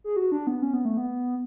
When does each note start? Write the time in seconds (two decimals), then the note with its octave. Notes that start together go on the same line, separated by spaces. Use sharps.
0.04 G#4
0.17 F#4
0.32 D4
0.47 B3
0.62 C#4
0.73 B3
0.85 A3
0.97 B3